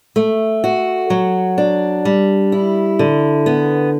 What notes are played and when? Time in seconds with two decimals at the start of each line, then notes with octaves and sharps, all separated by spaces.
0.16 A3
0.64 F#4
1.10 F#3
1.58 D4
2.05 G3
2.52 E4
2.99 D3
3.46 B3